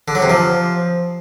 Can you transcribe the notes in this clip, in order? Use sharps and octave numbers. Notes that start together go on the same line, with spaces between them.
D3
F#3
C3
F3